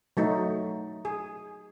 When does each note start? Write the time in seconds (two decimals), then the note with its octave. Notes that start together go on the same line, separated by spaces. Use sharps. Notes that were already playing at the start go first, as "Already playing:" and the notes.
0.17 F#3 A3 D#4
1.05 G#4